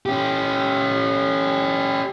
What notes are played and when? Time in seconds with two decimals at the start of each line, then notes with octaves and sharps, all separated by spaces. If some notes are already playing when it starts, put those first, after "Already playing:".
0.06 C#4 G4